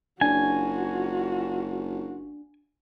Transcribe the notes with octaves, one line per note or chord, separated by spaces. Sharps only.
F#1 D4 F4 F#4 G#5